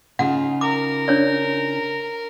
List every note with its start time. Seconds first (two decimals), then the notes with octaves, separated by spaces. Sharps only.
0.19 C#3 D#4 F4 F#5
0.61 A#4 D6
1.08 D4 C#5 D5